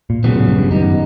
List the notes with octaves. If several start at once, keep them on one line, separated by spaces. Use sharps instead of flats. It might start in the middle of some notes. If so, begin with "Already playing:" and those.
A#2
A#2 C#3 F#3 B3
A2
G2
G2
F#2 D#3 G3 B3 D#4